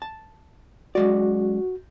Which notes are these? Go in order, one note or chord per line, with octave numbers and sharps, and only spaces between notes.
A5
F#2 G#3 F#4 D5